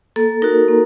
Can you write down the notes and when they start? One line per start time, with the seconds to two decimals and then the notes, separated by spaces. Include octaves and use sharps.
0.16 A#3 A4
0.42 D#4 F#4 A#4
0.68 A#3